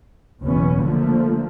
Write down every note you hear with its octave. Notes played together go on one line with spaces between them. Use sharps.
F#1 E2 B2 B3 C#4
D3 F3 A3 A#3